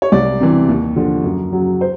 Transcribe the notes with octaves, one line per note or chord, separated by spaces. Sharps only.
C#5
C2 D5
C3 E3
D#2
D3 F3
F#2
C#3 F#3
C5